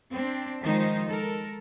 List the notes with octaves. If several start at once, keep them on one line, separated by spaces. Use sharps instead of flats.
C4 D4
D#3 F3 G#3 D#4 C5
G#3 A4 A#4